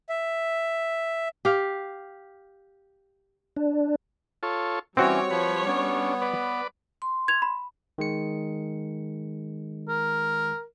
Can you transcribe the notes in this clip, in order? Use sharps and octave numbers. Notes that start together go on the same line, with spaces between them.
E5
G4 F5
D4
F4 A4 C#5
E3 G3 C4 C#4 F#4 C#5 D5
F3 B4
B3 C#4 D4
B4 D5
C6
G#6 F7
B5
D#3 G#3 C#7
A#4